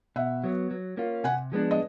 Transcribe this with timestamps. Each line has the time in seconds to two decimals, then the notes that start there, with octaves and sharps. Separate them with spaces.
0.16 B2 E5 F#5
0.44 F#3 B3
0.71 F#3
0.97 A#3 C#4 F4
1.24 C3 F#5 G#5
1.52 F3 G#3 B3 D4
1.71 D#5